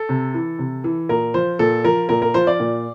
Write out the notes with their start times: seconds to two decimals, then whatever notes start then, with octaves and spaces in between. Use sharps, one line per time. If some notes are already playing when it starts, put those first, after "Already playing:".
Already playing: A4
0.09 C3
0.34 E3
0.59 C3
0.84 E3
1.09 A#2 A#4
1.34 F3 C5
1.59 A#2 A4
1.84 F3 A#4
2.09 A#2 A#4
2.22 A#4
2.34 F3 C5
2.47 D5
2.60 A#2